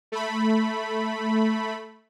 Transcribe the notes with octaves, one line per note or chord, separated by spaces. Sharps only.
A3 B5